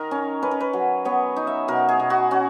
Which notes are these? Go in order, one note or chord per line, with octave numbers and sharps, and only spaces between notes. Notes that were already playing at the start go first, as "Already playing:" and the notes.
Already playing: D#3 A#4
C#4
C#4 B4
A#4
B4
F#3
B3 C#5
D#4
E5
B2 A#4
G#4
B2
F#4
C#4 F#4